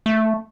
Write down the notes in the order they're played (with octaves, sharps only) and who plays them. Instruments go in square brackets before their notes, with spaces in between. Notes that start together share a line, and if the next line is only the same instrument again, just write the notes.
[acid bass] A3